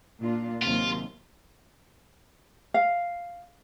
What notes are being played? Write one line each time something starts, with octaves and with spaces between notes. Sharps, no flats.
A#2 D4 F4
D#2 C3 F#3 F4
F5